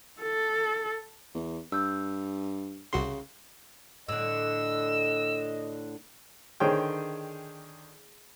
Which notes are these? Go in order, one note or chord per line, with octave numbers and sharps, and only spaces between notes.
A4
E2
G2 E6 G6
C2 C#3 F#4 C6
A2 D3 D#5 E6
D3 D#3 G#4 C5 C#5 G5